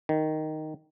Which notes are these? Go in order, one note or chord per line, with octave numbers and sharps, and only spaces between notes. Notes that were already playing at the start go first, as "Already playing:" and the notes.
D#3